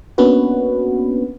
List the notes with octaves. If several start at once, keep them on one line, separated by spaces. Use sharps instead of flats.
A#3 B3 C#4 D4 F#4 B4